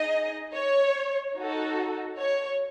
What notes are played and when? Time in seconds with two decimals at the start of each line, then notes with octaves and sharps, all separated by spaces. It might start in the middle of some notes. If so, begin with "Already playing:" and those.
Already playing: D#4 G#4 D#5
0.54 C#5
1.36 D#4 F#4 A4
2.19 C#5